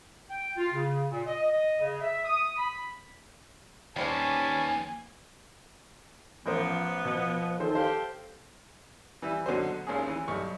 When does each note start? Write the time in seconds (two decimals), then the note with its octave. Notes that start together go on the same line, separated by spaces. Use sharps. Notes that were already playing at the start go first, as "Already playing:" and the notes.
0.30 G5
0.57 F4
0.72 C#3
1.11 A#2
1.25 D#5
1.42 D#5
1.80 C#3
2.01 E5
2.25 D#6
2.57 B5
3.96 D#2 G3 C4 C#4 B4 C5 G#5 A5
6.46 A1 F3 B3 A#4 C5
7.05 B2 F3
7.60 D#3 A4 C5
7.75 G4 C5 F5
9.22 E3 G3 E5 E6
9.46 B2 D3 F#3 C5
9.87 G#1 D#2 A#3 C#4 G#4
10.08 E3
10.28 B1 G3 D#4 C#6